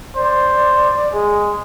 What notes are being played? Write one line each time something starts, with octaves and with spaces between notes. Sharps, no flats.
C5 D5
G#3 G#4